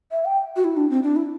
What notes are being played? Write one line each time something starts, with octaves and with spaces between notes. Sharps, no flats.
E5
G5
F#4
E4
D4
C4
D4
E4